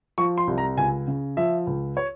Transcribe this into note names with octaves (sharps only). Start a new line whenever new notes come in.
F3 C#6
C6
C2
A#5
C#2 G#5
C#3
F3 E5
C#2
C#5